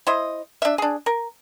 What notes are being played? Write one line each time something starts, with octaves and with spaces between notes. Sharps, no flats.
E4 C5 D#5
D4 E5
D4 G#4
A#4